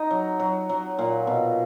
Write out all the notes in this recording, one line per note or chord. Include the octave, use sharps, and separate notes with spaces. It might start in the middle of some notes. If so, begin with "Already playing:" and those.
Already playing: D#4 D#5
F#3
F#3
F#3
A#2
B2